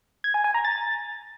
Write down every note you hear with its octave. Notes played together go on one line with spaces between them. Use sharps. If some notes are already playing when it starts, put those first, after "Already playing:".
G#6
G#5
G#5
A#5
A6